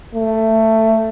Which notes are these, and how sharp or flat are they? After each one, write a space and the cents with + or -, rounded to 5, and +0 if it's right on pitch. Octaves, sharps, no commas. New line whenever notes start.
A3 +15